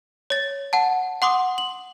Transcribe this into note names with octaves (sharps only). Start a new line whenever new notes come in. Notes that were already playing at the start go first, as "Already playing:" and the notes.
C#5 A6
F#5 A5
F#5 C6 D6 D#6
F#7